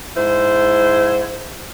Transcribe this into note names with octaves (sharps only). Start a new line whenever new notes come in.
G#2 E4 C5